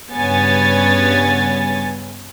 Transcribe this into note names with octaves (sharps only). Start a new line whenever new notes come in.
G2 C#3 B3 C#5 G#5 A6